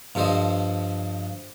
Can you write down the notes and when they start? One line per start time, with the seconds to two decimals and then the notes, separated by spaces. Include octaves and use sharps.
0.15 G2 F3 A4 C5 D#5